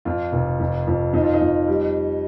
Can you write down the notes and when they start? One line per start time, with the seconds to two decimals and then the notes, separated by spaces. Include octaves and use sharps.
0.05 F2 F4
0.32 F1
0.59 F2
0.87 F2
1.13 F2 D#4
1.24 F4
1.34 D#4
1.41 F2
1.67 G3